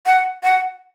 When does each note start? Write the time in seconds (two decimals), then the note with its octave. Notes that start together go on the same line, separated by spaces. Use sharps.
0.06 F#5
0.43 F#5